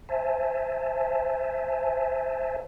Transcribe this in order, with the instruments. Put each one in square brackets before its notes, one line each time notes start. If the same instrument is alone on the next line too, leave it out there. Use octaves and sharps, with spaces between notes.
[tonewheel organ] C5 E5 G#5 A5